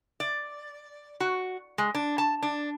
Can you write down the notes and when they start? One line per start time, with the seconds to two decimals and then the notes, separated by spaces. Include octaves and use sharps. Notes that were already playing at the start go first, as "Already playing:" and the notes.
0.20 D5
1.20 F#4
1.78 G#3
1.95 D4
2.18 A5
2.43 D4